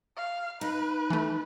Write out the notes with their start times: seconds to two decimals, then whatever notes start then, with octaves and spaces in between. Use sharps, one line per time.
0.17 F5
0.61 D#4 B4
1.10 E3 A3